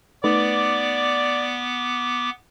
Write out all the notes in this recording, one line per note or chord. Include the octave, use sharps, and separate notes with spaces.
A3 B3 D#4 B4 D5 D6